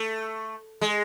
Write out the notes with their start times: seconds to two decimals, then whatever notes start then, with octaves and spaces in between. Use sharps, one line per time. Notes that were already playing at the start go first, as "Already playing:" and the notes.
Already playing: A3
0.81 G#3